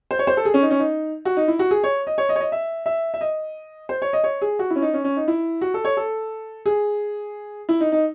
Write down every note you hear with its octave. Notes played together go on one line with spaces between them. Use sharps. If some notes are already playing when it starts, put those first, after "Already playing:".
C5
C#5
C5
A4
G#4
C#4
D#4
C#4
D#4
F#4
D#4
E4
F#4
G#4
C#5
D#5
C#5
D#5
C#5
D#5
E5
E5
E5
D#5
C5
C#5
D#5
C#5
G#4
F#4
E4
C#4
D#4
C#4
C#4
D#4
E4
F#4
A4
C#5
A4
G#4
E4
D#4
D#4